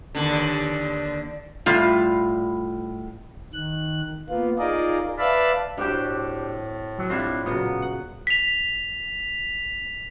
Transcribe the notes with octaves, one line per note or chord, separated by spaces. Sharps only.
D#2 D3
A2 G3 F4
D#3 F#6
A#3 B3 F4
D#4 F4 G#4 A#4 D5 D#5
B4 D5 E5 F5 A5 B5
A2 G3 C4 D4 F#4 G4
F#3
G3 C4 D4 E4 F4 D#5
A#2 C#3 F#3 B3
F#5
B6 F7